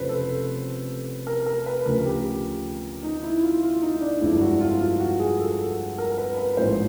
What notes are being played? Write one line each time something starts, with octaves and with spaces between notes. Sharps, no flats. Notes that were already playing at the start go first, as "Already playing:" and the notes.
Already playing: F1 F2 C#3 B4 C5
A4
A#4
A#4
B4
D2 C#3 F3 A#4
G4
D#4
E4
F4
F4
D#4
D4
G1 F2 D3 F3 G#3 E4
F#4
F4
F4
F#4
G#4
A4
A#4
B4
B4
A1 G#2 F3 A#3 C5